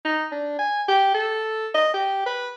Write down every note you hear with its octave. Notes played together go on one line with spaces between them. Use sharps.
D#4
D4
G#5
G4
A4
D#5
G4
B4